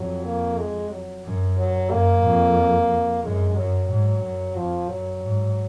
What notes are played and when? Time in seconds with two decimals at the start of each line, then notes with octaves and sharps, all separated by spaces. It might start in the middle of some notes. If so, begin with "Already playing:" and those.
Already playing: F2 F#3
0.24 A#3
0.58 G#3
0.91 F#3
1.25 F#2
1.57 F#3
1.91 F#2 A#3
2.23 F2
3.23 F#2 G#3
3.56 F#2 F#3
3.90 G#2
4.22 F#2
4.56 F2 F3
4.89 F#2 F#3
5.23 G#2